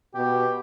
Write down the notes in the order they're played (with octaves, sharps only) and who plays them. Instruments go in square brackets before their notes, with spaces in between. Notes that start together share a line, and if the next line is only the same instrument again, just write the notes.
[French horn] B2 [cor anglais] G4